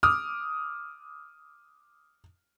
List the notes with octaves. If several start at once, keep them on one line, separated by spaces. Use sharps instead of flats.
D6 D#6 F6